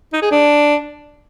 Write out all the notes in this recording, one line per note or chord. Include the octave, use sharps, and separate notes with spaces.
D#4
G#4
D4